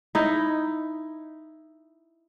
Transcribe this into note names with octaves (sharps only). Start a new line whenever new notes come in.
D#4 E4 D#5